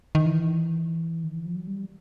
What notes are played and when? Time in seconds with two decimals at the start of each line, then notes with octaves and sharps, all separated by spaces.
0.15 D#3
0.26 E3
1.24 D#3
1.35 E3
1.46 F3
1.56 F#3
1.67 G3